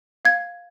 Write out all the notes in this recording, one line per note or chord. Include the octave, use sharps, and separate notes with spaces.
F5 G#6